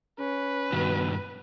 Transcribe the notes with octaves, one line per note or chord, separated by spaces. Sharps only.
C#4 B4
G2 B2 D#3